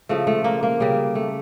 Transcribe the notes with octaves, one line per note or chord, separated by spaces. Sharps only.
C#3 F3 A3
A3
A#3
A#3
C#3 G3
A3